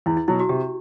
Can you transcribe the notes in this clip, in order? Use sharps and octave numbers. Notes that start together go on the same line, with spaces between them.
E2 E4
E4
B2 F#3 E4
F#4
C3 G4